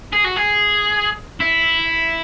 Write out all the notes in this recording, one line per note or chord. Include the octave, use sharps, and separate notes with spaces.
G#4
F#4
G#4
E4